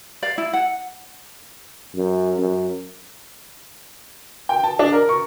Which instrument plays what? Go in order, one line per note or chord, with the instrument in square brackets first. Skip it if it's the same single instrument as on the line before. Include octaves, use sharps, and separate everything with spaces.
[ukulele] D5 F5
E4
F#5
[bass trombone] F#2
F#2
[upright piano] G5
A5
D4
A#4
C#6